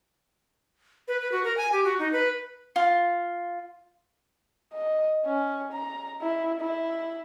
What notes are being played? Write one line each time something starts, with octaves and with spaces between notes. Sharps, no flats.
B4
B4
F#4
A#4
G#5
G4
F#4
D#4
B4
F4
D#5
C#4
A#5
E4
E4